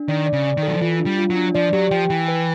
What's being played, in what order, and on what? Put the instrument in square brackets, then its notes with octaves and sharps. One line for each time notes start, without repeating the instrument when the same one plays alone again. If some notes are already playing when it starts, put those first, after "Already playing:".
Already playing: [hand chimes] D4
[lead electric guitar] D#3 [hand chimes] D5
[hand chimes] D5
[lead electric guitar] C#3
[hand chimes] D5
[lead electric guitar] D#3
[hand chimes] A4
[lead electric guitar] F#3
F3
[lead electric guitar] E3 [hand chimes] F4
[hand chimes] D4
[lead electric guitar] G3
[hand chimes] F4
[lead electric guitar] F#3
[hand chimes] D4
[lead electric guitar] F3 [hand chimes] D5
[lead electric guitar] F#3 [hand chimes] G4
[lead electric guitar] F3 [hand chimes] G5
[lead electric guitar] E3 [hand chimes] G5
[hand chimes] B4